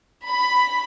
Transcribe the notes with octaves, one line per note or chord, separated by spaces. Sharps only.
B5